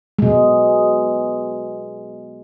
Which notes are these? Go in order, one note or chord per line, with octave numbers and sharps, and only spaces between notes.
B2 G#3